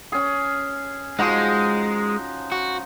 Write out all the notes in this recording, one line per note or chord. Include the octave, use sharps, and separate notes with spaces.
C#4 G#4
F3 G#3 D#4 F#4
F#4